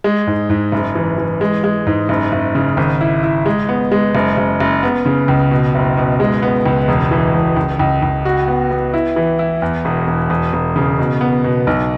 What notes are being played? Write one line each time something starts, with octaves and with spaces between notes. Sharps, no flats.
G#3
G#2
G#2
F#1
E3
E3
G#3
G#3
G#2
F#1
F#1
C#3
G#1
E4
E4
G#3
B3
G#3
F#1
F#1
F#1
B3
C#3
C#2
B2
F#1
B2
G#3
B3
C#2
E1
E3
E1
C#2
C#2
C#2
F#4
B3
B3
E4
E3
E4
E2
E1
E1
E1
E1
C#3
B2
B3
B2
B1